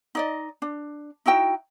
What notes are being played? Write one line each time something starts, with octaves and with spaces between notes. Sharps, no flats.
D#4 D5 D#5
D4
D#4 E4 F#4 G5